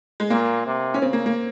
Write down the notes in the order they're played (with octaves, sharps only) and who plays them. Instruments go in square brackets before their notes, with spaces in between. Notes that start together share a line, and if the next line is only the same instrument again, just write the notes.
[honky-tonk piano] G#3
[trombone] A#2 [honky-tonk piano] A#3
[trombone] C3
[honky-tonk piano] C#4
[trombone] C#3 [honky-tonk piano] C4
[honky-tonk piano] A#3
A#3